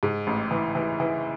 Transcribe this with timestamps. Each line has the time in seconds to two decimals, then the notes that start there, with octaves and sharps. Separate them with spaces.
0.03 G#2
0.27 A1
0.51 E3
0.75 E3
1.00 E3